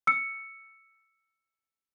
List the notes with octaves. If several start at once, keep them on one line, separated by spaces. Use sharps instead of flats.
E6 C#7